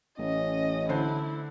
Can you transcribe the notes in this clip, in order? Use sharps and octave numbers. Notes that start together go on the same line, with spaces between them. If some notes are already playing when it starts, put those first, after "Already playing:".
A1 C#4 D#5
D3 E4 C5